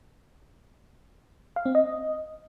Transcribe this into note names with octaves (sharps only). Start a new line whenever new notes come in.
F5
C4
D#5